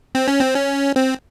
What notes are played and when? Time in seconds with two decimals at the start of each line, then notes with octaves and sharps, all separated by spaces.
0.15 C4
0.28 C#4
0.40 C4
0.55 C#4
0.96 C4